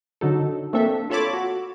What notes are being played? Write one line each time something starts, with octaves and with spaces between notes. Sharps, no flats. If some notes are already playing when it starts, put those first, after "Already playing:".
D3 F#3 D#4 A4
A3 A#3 C4 D4 A4 E5
F4 A4 C#5 A5 B5 D6
F#4